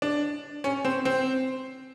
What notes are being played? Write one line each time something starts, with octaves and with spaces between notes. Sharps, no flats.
D4
C#4
C4
C4